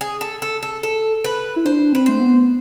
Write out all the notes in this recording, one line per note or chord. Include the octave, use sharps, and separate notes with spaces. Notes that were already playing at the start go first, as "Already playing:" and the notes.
G#4
A4
A4
A4
A4
B4
E4
D4 C5
C4 B4
A3 C5
B3